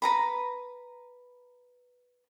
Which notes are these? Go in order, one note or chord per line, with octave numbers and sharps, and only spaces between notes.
B4 A#5 B5